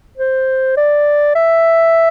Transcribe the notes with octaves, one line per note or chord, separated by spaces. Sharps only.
C5
D5
E5